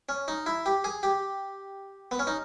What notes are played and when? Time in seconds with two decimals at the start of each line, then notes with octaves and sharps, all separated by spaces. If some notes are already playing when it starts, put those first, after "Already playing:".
0.09 C#4
0.28 D#4
0.46 E4
0.66 G4
0.84 G#4
1.03 G4
2.11 B3
2.19 C#4
2.27 D#4